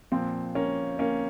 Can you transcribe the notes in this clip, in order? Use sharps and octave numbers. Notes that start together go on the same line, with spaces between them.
A#2 F3 C4
A#3 C#4
A#3 C#4